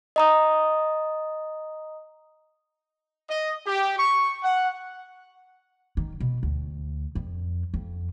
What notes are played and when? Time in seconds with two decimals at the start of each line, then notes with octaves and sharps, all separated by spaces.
0.16 D#5 A#5 D#6
3.29 D#5
3.65 G4
3.98 C#6
4.41 F#5
5.97 D#3
6.20 B2
6.43 D2
7.15 F2
7.74 F2